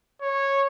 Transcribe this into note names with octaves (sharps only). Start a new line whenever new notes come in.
C#5